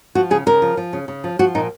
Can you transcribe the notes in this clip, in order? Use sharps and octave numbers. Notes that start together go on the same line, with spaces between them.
F3 F#4
C#3 G#4
C#3 A#4
F3
F3
C#3
C#3
F3
F3 F#4
A#2 D#4